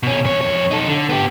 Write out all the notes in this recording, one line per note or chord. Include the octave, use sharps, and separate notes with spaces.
B2 C#4
E2 C#5
F2 C#5
D#4 A4
D3
B3 G4